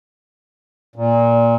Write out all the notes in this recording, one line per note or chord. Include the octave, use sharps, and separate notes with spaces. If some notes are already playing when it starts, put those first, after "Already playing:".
A#2